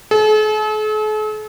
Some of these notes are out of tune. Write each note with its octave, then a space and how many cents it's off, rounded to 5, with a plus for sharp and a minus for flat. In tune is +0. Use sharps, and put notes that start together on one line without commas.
A4 -45